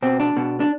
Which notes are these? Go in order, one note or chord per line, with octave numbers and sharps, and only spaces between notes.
B2 C4
D4
B2
D4